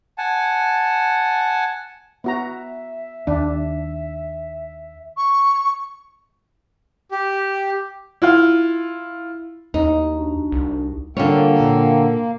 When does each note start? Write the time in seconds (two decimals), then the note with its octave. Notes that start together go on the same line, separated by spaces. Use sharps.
0.18 F#5 G#5 A5
2.24 B3 F#4 E5 A#5
3.27 D#2 D4
5.16 C#6
7.12 G4
8.22 E4 F4 F5
9.74 D#2 D#4
10.15 D4 F#4
10.52 C2
11.17 D3 G3 A#3 F4 A4 C#5 F#5 G5
11.60 A#2